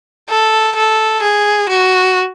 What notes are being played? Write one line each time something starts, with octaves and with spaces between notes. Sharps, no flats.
A4
A4
G#4
F#4